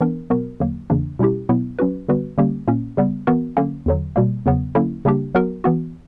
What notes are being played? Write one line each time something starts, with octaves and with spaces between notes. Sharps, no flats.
E3 B3 D4 A#4
B2 F#3 B3 F#4 A#4
E2 D3 F#3 A#3
E2 C#3 E3 A#3 D4
B2 G3 C#4 E4 G4
B2 F#3 B3 E4
F#3 C#4 F#4 B4
D3 G3 B3 F#4 B4
D3 G3 A#3 C#4 G4
A#2 A#3 C#4
C#3 G3 B3
E3 B3 F#4 A#4
D3 F#3 A#3 C#4
E2 D3 F#3
B2 G3 A#3
E2 C#3 F#3 B3
D3 F#3 A#3 C#4 E4
C#3 G3 A#3 D4 G4
F#3 B3 F#4 A#4
E3 B3 F#4